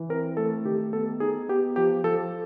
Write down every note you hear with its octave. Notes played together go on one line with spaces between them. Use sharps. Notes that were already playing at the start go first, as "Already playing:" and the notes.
Already playing: E3
C4 A#4
A3 A4
D#3 G4
B3 A4
D#4 G#4
B3 G4
F3 G4
F3 A4